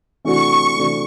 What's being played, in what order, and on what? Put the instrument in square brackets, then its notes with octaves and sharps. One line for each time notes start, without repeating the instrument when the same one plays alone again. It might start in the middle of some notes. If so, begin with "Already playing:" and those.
[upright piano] C3 E3 A3 D4 F#4 [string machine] C#6
[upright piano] C3 E3 A3 D4 F#4